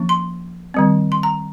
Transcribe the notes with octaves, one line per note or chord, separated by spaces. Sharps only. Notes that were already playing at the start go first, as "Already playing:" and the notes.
Already playing: F3 A#3 C#4
C6
D#3 G3 C4
C6
A#5